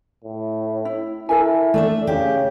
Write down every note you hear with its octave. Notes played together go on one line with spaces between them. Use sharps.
A2
E4
E4 A4 A#4 G#5
A3 D4 E5
C#3 G4